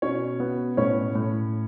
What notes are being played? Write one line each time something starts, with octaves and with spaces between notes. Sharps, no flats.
B2 C#4 C#5
B3
A2 C#4 C#5
A2